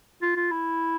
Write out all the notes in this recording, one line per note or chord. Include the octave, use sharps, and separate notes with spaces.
F4
F4
E4